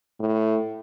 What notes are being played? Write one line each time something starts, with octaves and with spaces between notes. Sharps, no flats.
A2